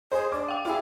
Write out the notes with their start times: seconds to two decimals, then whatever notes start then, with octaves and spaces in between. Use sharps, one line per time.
0.12 G#4 C5 D#5 C6
0.32 D4 D6
0.48 F5 G5
0.65 E4 F4 G#4